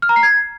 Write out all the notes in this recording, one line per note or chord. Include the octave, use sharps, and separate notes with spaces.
F6
A#5
C7
G#6